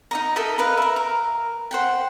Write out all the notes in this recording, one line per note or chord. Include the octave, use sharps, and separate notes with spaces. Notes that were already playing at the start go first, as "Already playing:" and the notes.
D#4 D#5 A#5
A4 A#4 D#5 E5
A#4 B4 F5
A#4 E5
A#4
C5 F#5 G5